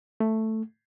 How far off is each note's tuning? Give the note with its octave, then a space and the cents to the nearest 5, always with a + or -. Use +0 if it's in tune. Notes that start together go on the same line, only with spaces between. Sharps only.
A3 +5